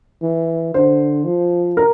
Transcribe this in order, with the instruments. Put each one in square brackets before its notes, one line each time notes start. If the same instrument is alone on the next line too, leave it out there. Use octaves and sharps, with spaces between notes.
[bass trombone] E3
[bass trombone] D3 [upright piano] C5
[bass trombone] F3
[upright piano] A#4